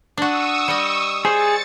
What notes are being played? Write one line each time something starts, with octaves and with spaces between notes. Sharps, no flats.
D4 F#4 C#6 D#6 E6
G3 D#5
G#4 C5 A6 C#7